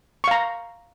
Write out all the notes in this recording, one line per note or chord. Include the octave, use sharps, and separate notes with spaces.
F5 A#5 C#6